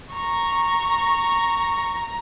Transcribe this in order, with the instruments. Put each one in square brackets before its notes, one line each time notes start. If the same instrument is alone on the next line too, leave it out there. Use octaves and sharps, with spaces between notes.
[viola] A#5 [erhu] C#6